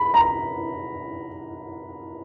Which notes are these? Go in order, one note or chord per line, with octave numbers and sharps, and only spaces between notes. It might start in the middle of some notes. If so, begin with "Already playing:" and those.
Already playing: B5
A#5